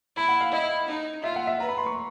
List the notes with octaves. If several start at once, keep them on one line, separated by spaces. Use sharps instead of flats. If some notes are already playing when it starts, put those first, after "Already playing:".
E4 B5
F#5
F5
E4 D#5
D#4
F4 E5
F#5
E5
B4 A#5
B5
C6
C#6